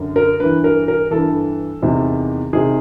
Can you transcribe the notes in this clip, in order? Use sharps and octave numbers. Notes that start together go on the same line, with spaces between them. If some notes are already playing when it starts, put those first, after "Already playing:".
Already playing: F#2 D3
A#4
G2 E3 B4
A#4
A#4
G2 E3 A4
E2 C3 D#3
C3 D#3 G#4